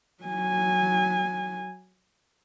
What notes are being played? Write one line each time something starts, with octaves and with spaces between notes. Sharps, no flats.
F#3 G#5